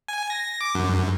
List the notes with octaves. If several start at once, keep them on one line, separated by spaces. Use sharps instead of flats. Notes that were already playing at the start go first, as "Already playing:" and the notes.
G#5
A#6
D6
F#2